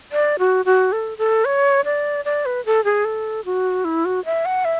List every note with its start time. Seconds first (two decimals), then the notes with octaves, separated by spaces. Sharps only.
0.12 D5
0.39 F#4
0.65 F#4
0.92 A4
1.18 A4
1.45 C#5
1.85 D5
2.25 D5
2.46 B4
2.66 A4
2.84 G#4
3.05 A4
3.45 F#4
3.85 E4
4.05 F#4
4.25 E5
4.45 F#5
4.65 E5